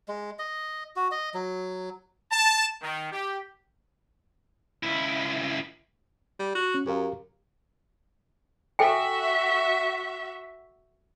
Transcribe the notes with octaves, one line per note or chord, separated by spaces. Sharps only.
G#3
D#5
F#4
D#5
F#3
A5
D#3
G4
C#2 E4
G3
F#4
C#4
F#2 G4 A#4 F5
F#4 A4 E5 G5 G#5